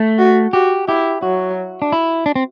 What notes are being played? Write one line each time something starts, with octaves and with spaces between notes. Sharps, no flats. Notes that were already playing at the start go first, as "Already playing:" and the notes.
Already playing: A3
F#4
F#4 G4
E4 G4
F#3 F#4
D4
E4
D4
C4